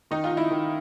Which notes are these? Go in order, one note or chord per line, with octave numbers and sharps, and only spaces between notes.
D#3 D#4
F4
D#3
E4
D#3